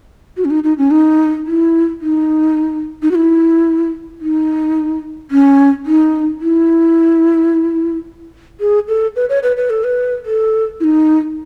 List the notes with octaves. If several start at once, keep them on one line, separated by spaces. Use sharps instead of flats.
F#4
C#4
D#4
D#4
C#4
D#4
E4
D#4
D#4
F#4
E4
D#4
C#4
D#4
E4
G#4
A4
B4
C#5
B4
B4
A4
B4
A4
E4
D#4